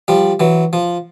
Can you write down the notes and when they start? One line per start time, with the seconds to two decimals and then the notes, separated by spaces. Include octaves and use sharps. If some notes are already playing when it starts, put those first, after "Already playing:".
0.08 F3 G3
0.40 E3 F#3
0.73 F3